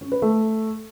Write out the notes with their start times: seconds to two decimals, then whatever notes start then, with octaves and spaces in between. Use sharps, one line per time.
0.01 C#4
0.12 B4
0.22 A3